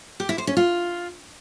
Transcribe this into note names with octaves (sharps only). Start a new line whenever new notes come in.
G4
E4
C5
C#4
F4